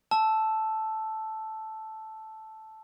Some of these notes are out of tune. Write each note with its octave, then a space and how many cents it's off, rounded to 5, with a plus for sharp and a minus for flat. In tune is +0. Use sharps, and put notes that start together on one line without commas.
A5 -5 E6 +0